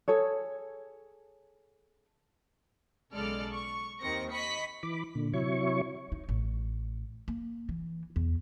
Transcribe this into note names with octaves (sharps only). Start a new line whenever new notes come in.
G#4 A4 C#5
B1 C#3 G#3 A4 D5 F6
C#6
D#2 D#3 C4 A#6 C#7
D#5 B5 C#6 B6 C#7
E3 B5 D6
A#2 D3
C3 F#3 E4 C#5 C#6
D#4
A1
A#3
E3
E2